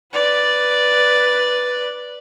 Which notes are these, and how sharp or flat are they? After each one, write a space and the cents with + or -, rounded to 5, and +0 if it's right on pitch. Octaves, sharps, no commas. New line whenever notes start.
B4 +0 D5 +0